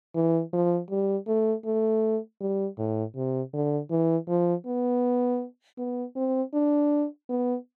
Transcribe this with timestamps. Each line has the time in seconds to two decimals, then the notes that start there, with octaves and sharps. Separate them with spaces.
0.15 E3
0.53 F3
0.90 G3
1.27 A3
1.65 A3
2.41 G3
2.78 A2
3.15 C3
3.53 D3
3.91 E3
4.28 F3
4.66 B3
5.78 B3
6.16 C4
6.54 D4
7.29 B3